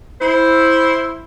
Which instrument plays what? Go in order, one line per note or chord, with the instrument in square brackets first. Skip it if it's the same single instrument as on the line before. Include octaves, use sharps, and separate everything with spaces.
[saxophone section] E4 C5